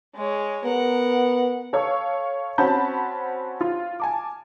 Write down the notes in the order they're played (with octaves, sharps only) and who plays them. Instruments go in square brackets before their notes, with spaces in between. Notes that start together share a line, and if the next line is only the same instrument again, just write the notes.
[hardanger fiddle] G#3 C#5
[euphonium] B3 [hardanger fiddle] A#4 F#5
[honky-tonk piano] A4 C#5 F5 C#6
C4 C#4 F#4 A5 B5 G6
F4
G#5 A5 D6